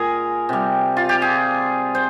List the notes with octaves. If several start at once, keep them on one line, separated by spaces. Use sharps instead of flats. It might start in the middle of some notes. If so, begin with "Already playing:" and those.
Already playing: A#2 G#3 G#4 A#4
C3 G3
F4
G4
G#4
C5